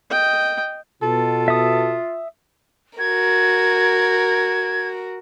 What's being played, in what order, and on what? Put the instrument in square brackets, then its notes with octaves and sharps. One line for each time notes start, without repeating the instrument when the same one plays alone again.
[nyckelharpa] D#5 G5
[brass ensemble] B2 [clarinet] F4 [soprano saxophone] A4
[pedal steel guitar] E5 D#6
[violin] F#4 A#4 [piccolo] G#6